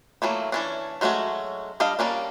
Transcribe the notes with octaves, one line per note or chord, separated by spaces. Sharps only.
E3 F#3 A3 A#3
E3 C#4 D4
F#3 G#3 A3 C#4 F#4
G3 D4 D#5 F5
G3 A#3 C#4 D4